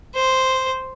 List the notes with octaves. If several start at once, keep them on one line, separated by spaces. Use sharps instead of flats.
C5